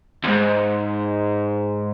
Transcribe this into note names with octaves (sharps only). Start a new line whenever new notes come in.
D#2 G#2